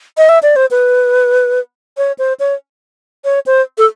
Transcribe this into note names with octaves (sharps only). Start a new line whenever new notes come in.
D#5
E5
D5
C5
B4
C#5
C5
C#5
C#5
C5
A4